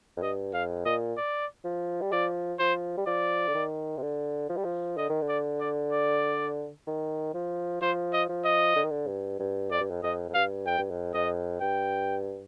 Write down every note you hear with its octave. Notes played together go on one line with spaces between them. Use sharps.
F2
G2 D#5
F2 F5
A#2 D#5
D5
F3
G3
F3 D5
F3 C5
G3
F3 D5
D3
D#3
C3
D3
F3
G3
F3
D3 D#5
D#3
D3
D5
D5
D5
D#3
F3
F3 C5
D#5
F3
D#5
D3
D#3
D3
G2
G2
F2 D5
G2
F2
F2 D#5
F2
G2 F5
F2 G5
G2
F2
F2 D#5
G2 G5